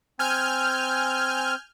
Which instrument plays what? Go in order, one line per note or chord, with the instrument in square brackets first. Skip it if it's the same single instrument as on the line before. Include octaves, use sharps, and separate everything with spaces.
[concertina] C4 [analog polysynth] G#5 F6 G6